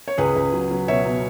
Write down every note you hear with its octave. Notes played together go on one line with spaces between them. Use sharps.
C#5
C#2 G#4 B4
C#2
F#3
F#3
B2 C#5 E5
B2